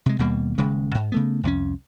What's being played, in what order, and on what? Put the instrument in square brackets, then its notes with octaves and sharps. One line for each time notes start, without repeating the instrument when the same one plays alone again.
[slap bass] C3 G#3
D#2 B2 G3 A#3
D#1 C#3 G#3
G#2
C#3 A3 B3
C2 F2 G#3 C#4